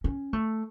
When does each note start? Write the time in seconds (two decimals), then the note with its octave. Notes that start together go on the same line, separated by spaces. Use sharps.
0.04 C#4
0.33 A3